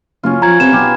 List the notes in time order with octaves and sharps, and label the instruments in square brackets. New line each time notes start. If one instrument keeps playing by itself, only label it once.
[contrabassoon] F#1 [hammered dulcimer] C#4 F4
[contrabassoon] F3 [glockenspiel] A#5 G#6
[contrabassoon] C3 [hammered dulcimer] B3 F#5 G#5 [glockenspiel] E7
[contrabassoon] B1 [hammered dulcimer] F4 G4 G#4